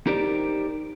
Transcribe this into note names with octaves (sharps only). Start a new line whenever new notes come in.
D#4 G4 A#4 C5 D5